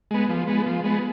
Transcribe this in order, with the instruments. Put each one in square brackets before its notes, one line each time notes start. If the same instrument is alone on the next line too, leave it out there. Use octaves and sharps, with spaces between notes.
[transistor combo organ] G#3 B3
F3
G#3 B3
F3
G#3 B3